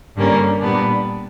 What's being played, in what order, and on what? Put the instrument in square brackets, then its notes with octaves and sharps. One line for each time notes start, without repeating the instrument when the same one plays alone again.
[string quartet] G2 D3 G3 A#3 C#4
A#2 G3 B3 D4